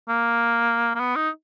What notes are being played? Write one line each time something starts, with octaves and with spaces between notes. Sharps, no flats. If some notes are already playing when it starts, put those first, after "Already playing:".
A#3
A#3
B3
D#4